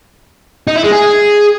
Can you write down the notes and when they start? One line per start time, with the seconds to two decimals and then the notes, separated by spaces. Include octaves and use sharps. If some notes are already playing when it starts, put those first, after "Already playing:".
0.67 D#4
0.76 E4
0.84 G#3
0.92 G#4